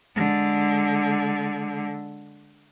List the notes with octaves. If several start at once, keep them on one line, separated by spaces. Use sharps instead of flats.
D3 G#3